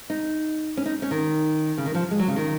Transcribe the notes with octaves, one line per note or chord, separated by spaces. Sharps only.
D#4
C#4
D#4
C#4
D#3
C#3
D#3
F3
G#3
F#3
C#3
D#3